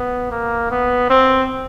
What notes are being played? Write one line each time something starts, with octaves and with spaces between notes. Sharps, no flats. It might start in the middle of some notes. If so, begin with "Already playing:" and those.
Already playing: B3
A#3
B3
C4